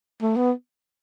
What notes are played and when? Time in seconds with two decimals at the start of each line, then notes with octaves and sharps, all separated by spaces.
0.22 A3
0.37 B3